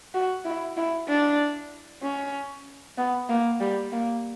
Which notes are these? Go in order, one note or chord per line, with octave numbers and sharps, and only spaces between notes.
F#4
E4
E4
D4
C#4
B3
A#3
G3
A#3